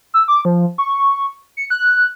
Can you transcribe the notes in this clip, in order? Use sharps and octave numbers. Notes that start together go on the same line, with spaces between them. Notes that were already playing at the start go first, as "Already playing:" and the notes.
E6
D6
F3
C#6
C#7
F#6